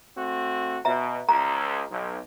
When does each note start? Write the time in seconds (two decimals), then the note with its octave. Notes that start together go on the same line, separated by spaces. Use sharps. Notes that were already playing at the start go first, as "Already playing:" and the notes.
0.17 A3 C4 F#4
0.85 B2 E5 A#5
1.29 C#2 A#5
1.90 B1